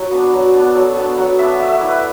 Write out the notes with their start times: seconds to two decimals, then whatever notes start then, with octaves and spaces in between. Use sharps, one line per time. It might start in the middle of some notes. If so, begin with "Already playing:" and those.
Already playing: F#3 F#4
0.11 B3 D4
0.33 F#3
0.54 B3 D4
0.75 F#3 A4
0.96 B3 D4 A5
1.17 F#3 F#5
1.39 B3 D4 E5
1.60 A3 E5
1.75 D5
1.81 E4
1.88 B4